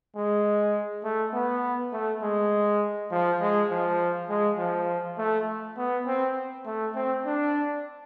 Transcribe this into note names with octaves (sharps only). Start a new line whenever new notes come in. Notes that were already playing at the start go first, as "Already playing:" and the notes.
G#3
A3
B3
A3
G#3
F3
G#3
F3
G#3
F3
A3
B3
C4
A3
C4
D4